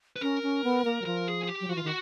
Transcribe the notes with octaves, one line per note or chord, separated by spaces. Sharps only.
B4
C#4 A#4
C#4
B3
A#3
F#3
F3 A#4
G#4
G#4
G4
F#3
F3 F#4
E3 F4
D#3
F#4